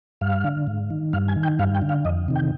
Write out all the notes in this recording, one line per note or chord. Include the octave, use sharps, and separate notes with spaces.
G2 F5
D3
G#2
D#3
G2 F5
G#5
D#3
G5
G2 F5
G5
D3
F5
F2 D#5
C3 D#3
G5